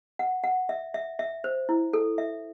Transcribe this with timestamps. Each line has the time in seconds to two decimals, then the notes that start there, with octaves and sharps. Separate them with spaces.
0.19 F#5
0.44 F#5
0.69 E5
0.94 E5
1.19 E5
1.44 C5
1.69 E4
1.93 A4
2.18 E5